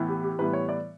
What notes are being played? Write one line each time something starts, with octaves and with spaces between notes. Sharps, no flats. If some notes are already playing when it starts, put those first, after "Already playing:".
Already playing: A2 E3 B3
G4
G4
A2 E3 G3 B3 B4
C#5
D5